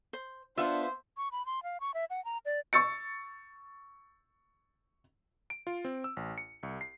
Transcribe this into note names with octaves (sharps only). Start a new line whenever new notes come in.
C5
B3 D4 F4 C5 E5
C#6
B5
C6
F5
C#6
E5
F#5
A#5
D5
C#6 E6 A6 C#7
D7
F4
C4
E6
A1
C#7
C2
C7